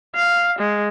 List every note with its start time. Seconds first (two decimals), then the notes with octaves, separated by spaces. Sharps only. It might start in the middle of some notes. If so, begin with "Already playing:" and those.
0.16 F5
0.59 G#3